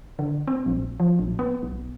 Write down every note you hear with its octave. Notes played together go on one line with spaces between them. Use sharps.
D3
C4
A#1
F3
A#1
B3
B1